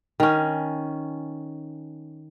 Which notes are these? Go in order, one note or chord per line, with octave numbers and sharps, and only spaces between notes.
D#3 C#4